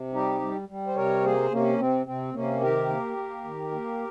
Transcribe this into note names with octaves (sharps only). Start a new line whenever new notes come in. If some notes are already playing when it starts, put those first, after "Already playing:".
Already playing: C3
G3 D#4 G4
G3
G3
C5
C3 A#4 C#5
A#3 G#4 C5
C3 A#3 C#4
C3 C4
C3 C4
C3 A#3 C#4
D#3 G4 A#4
A#3
A#3
D#3
A#3